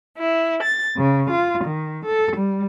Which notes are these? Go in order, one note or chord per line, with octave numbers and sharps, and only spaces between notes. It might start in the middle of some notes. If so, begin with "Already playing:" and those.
E4
A6
C#3
F4
D#3
A4
G3